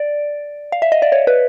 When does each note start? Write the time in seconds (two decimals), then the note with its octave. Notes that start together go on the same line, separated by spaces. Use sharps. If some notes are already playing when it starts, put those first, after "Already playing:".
Already playing: D5
0.72 F5
0.82 E5
0.92 D#5
1.02 D5
1.12 C#5
1.27 B4